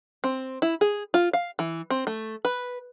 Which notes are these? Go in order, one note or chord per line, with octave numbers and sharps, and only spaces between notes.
C4
E4
G#4
F4
F5
E3
C4
A3
B4